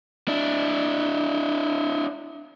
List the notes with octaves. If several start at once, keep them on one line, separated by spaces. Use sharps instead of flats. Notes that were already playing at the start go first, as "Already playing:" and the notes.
D4 E4